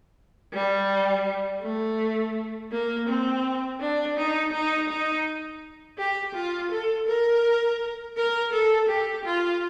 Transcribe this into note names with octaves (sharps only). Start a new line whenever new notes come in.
G3
A3
A#3
C4
D4
D#4
D#4
D#4
G4
F4
A4
A#4
A#4
A4
G4
F4